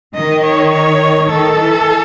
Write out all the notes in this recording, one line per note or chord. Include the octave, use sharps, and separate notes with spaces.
D#3 D#5
C#5
C#5
D#3 A4
E3